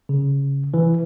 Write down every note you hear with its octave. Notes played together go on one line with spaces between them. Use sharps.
C#3
E3